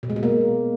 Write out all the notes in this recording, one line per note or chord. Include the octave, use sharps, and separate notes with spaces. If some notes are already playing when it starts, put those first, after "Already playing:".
B2
G#3
B2
A#3